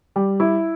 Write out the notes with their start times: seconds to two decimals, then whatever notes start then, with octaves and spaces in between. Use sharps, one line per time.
0.16 G3
0.40 E4